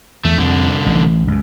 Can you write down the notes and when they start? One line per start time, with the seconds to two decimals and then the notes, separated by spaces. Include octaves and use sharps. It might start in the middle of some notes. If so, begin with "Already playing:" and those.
0.25 E2 A3
0.38 C2 F2 D3
0.86 A1 E3
1.28 C#2 F#2